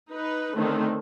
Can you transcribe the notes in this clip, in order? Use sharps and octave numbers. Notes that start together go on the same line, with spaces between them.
D#4 B4
D3 D#3 A3 C4 C#4